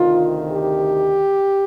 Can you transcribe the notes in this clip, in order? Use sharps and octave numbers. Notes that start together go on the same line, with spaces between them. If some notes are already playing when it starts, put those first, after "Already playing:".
Already playing: D2 C3 D#3 F4
G4